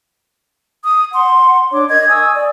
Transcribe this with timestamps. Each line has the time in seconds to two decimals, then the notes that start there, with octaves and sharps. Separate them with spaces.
0.82 D#6
1.12 F#5 C6
1.71 D4 C#5 D6
1.88 A#4 D#5 G#6
2.08 G#5 C#6 D#6 E6
2.34 D5